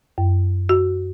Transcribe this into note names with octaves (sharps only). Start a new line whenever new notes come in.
F#2
F#4